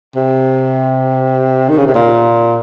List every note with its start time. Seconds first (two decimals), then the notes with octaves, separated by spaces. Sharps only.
0.16 C3
1.69 D#3
1.78 C#3
1.87 C3
1.95 A#2